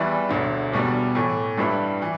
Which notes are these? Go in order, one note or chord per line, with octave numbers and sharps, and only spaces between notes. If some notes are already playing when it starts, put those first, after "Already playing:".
Already playing: E2 E3 G3 E4 B4
E1 D2 D3
E2 B2 G3 D4
A2 E3 A3
G2 G3 E4 B4
E3